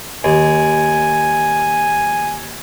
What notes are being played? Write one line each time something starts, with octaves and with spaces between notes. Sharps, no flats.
D#2 G#5